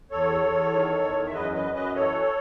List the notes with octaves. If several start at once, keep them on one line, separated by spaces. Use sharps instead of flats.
E2 A4 C#5
E2
D#3
E2
E5
F#2 B4 D#5
B4 D#5
F#2
B4 D#5
E3 A4 C#5